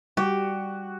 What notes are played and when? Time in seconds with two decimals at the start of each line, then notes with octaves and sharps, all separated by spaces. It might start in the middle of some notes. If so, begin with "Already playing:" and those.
0.17 G3 F#4 G4